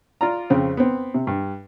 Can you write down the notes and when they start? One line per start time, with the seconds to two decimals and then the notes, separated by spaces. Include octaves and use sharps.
0.21 F4 D5 A#5
0.50 F2 C#3 C4
0.77 B3 C4
1.14 C3
1.27 G2